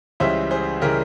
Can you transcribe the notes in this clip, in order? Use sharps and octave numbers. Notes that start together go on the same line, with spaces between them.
C#2 C#3 E3 G3 C5 E5
G#4 C5
C#3 E3 G3 G4 A#4